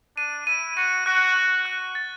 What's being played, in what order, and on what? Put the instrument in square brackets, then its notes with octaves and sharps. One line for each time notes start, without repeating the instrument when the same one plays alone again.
[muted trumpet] D4 [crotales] D#7
[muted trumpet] E4 [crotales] D#7
[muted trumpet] F#4 [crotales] D#7
[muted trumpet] F#4 [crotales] F#6
[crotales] F#6
F#6
A6